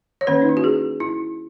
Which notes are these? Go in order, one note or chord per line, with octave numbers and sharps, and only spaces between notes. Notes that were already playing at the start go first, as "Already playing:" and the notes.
C#5
D#3 A#3 C#4 B4
D#4
E4
F#4
G#4
E4